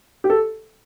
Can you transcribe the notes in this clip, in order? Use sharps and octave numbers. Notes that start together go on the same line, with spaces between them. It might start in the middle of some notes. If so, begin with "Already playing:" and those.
G4
A4